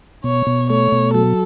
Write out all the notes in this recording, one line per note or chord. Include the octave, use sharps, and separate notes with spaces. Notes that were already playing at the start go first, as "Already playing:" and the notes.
B2 C#5
B2
A3 C#5
B2
F#3 A4